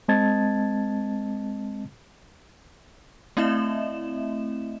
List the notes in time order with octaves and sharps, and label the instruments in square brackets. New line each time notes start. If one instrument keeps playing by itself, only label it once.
[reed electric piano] G#3 C4 D#5 A5 G#6 A6
[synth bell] A3 C4 E4 D#5 E5 E7